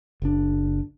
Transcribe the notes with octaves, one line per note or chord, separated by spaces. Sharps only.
F#1 D4